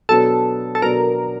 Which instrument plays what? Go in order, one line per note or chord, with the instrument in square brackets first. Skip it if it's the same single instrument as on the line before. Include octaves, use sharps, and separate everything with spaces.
[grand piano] B2 F#3 B3 D4 [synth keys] A4
[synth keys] A4
[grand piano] B2 F#3 B3 D4 [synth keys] A#4